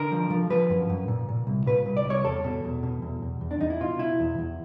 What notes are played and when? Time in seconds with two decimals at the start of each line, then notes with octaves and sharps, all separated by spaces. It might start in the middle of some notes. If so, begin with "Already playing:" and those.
Already playing: D3 A#4
0.12 F3
0.30 F3
0.50 F3 B4
0.70 F#2
0.89 F#2
1.08 A#2
1.29 A#2
1.47 C2
1.66 A#2 B4
1.86 C2
1.97 D5
2.05 C2
2.10 C#5
2.25 E2 A4
2.44 B2
2.65 E2
2.83 B2
3.02 E2
3.22 E2
3.41 E2
3.51 D4
3.61 E2 D#4
3.70 E4
3.81 B2 F4
3.99 B2 E4
4.20 E2
4.38 E2